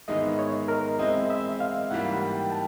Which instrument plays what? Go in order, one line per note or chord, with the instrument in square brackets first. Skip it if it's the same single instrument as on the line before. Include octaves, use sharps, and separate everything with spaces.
[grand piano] G#2 D#3 G#3 B3 E4 [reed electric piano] D#5
[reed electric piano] C#5
A#4
[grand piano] G#3 C4 E4 [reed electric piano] D#5
[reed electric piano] E5
F5
[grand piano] G#2 E3 G3 A#3 [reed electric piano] F#5
[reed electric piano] G5
A5